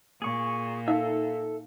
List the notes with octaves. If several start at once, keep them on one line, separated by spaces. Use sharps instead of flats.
A#2 G#4 C#6
D#4 A4 E5 F5